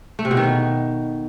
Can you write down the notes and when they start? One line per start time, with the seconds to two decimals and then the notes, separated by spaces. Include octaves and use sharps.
0.19 A3
0.25 C3
0.31 B2
0.37 D#3